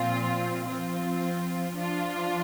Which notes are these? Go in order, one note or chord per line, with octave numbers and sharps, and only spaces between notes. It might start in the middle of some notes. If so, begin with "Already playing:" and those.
Already playing: A#2 F3 C4 F4
F3 C4 F4
F3 D4 F4